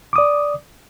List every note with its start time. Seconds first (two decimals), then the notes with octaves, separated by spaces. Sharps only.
0.13 D6
0.16 D#6
0.18 D5